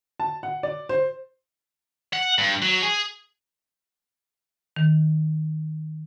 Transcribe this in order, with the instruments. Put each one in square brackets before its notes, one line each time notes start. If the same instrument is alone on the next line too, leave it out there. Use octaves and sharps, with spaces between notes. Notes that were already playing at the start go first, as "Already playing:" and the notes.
[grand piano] A5
F#5
D5
C5
[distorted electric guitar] F#5
G2
F#3
G#4
[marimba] D#3